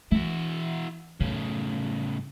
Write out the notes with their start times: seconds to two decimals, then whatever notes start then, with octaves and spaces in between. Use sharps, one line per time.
0.12 E3 E4 F#4
1.20 F#2 A2 C#3